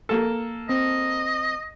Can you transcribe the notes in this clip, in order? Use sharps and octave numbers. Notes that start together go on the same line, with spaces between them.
A#3 A4
C4 D#5